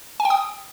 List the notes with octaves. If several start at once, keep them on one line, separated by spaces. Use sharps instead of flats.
G#5
G5
D#6